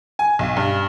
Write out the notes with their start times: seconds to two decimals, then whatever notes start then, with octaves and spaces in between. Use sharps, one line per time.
0.19 G#5
0.39 B1
0.56 G2